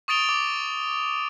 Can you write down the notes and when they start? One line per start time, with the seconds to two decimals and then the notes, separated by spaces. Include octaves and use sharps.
0.08 C#6 D#6 A6 D7 F7 G7
0.29 D6